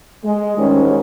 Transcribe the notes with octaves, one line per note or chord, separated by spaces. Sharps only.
G#3
D2 G#2 D#3 G3 C#4